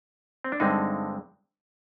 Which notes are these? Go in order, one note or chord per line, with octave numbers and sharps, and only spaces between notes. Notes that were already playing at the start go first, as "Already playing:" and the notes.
C4
D4
G2 D3 G#3 C4 D#4